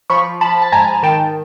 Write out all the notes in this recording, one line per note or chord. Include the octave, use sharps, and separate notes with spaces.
F3 B5 C#6
F3 A5 B5
A5
G#2 G#5 A#5
D#3 G5 A5